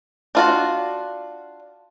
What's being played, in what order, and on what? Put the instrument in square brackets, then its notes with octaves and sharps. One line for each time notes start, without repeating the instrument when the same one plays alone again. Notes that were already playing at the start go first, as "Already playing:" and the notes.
[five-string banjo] D4 F4 F#4